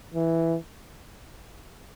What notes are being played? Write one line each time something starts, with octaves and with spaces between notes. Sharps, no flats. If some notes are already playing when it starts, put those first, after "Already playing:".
E3